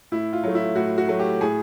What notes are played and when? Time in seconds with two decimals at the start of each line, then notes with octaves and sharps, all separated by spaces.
0.12 A2 E4
0.33 F4
0.44 F#3 A3
0.55 E4
0.75 A2 F#4
0.98 F#4
1.09 F#3 A3
1.19 G4
1.41 A2 G#4